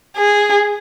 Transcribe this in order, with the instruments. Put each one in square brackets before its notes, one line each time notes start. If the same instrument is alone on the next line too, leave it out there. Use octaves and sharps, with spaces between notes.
[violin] G#4